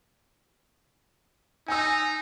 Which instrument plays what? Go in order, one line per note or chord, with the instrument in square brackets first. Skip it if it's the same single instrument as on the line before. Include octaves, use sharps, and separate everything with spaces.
[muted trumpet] D#4 [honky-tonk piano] G#5 E6